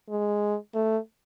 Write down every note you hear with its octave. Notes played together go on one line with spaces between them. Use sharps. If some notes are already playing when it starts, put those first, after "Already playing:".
G#3
A3